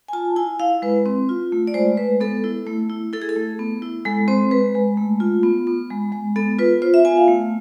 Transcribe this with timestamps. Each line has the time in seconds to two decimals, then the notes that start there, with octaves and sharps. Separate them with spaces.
0.08 G#5
0.13 F4 A5
0.36 E4 G#5
0.59 E4 F5
0.82 G#3 B4
1.06 C4
1.29 F4
1.52 A3
1.67 D5
1.74 G#3 C5
1.97 G#3 B4
2.20 B3 A4
2.44 E4
2.67 A3
2.90 E4
3.13 E4 A4
3.22 G#4
3.29 A4
3.36 A3
3.59 B3
3.82 E4
4.05 G#3 A4
4.28 C4 C5
4.51 G#3 B4
4.75 G#3
4.97 A3
5.20 F4
5.43 B3
5.67 B3
5.90 G#3
6.12 G#3
6.36 B3 A4
6.59 F4 B4
6.82 F4 C5
6.94 E5
7.05 B3 G#5
7.17 F5
7.28 A3